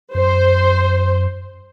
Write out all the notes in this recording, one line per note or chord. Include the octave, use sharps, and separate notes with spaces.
F#2 C5